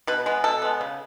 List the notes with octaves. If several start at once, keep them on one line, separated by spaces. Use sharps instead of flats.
B2 B4
G#3 B3
B2 A4
G#3 B3
C#3